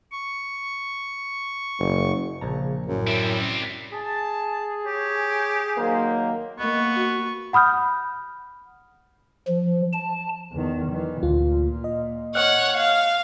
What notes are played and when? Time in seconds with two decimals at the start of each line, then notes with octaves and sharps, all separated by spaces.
0.12 C#6
1.79 F#1
2.41 A#1 C#3 A5 A#5
2.87 F#2 A2
3.07 G3 C4 E4
3.93 G#4 A5
4.85 G4 C#5
5.77 D#3 F#3 A#3 C5
6.60 A#3 B3 D#5 C#6
6.95 F#4
7.53 F#5 B5 D#6 F6 G6
9.48 F3
9.92 A5
10.52 E2 D#3
10.91 D#3 E3
11.23 D2 A#2 F4
11.84 D#5
12.35 C#5 D#5 F#5 F6 F#6
12.77 F5